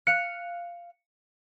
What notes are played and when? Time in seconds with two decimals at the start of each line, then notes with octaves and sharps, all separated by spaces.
0.07 F5 F#6 C#7